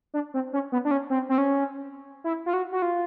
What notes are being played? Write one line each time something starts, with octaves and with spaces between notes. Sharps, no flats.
D4
C4
C#4
B3
D4
C#4
C4
C4
C#4
E4
F4
F#4
F#4
F4